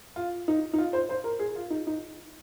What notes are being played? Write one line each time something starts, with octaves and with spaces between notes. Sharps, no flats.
F4
D#4
D#4
F4
C5
C5
A#4
G#4
F4
D#4
D#4